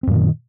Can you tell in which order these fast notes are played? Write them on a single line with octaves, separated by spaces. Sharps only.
C4 F#2 A#2 D#3